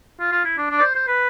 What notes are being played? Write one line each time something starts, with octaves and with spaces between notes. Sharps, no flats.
F4
F4
E4
D4
D4
D5
C5
C5
B4